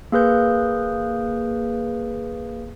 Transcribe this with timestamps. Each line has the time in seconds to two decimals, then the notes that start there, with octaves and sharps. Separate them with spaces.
0.12 A#3 G#4 B4 G6